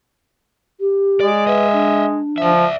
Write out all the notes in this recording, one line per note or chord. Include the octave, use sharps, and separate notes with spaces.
G4
G#3 D5
B4 D#5 E5
D4
F3 D5 E5